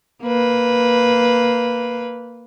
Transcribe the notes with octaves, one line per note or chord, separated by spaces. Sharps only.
A#3 B4